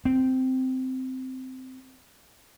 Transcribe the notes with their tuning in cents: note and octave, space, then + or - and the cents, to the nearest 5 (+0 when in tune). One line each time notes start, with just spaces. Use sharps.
C4 -10